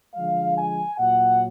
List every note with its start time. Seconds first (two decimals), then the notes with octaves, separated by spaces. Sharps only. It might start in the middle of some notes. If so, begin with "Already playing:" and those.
0.15 D3 F3 G#3 F5
0.57 G#5
0.99 A#2 F#3 F#5